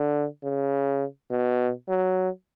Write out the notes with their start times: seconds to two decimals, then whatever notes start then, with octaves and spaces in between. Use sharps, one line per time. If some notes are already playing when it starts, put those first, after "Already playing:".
Already playing: D3
0.43 C#3
1.30 B2
1.88 F#3